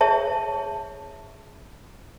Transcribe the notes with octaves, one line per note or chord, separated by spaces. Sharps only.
G#4 C#5 E5 A5